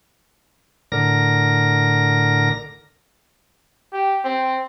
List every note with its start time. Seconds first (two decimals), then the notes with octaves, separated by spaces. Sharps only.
0.92 A2 D3 A#4 A#6
3.93 G4
4.24 C4